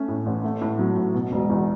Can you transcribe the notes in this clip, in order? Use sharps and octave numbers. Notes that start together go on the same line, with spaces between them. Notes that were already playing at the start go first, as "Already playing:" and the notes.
Already playing: A3 C#4
A2
A1
A3
A2
F#3
A2
B2
E1
E2